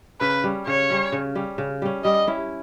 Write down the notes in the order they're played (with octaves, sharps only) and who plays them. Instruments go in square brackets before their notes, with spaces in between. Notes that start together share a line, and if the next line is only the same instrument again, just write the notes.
[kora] C#3 [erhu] B4
[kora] G3 C#4
[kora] C#3 [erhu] C#5
[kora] G3 C#4
C#3
G3 C#4
C#3
G3 C#4
[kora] G3 [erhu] D#5
[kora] C#4 E4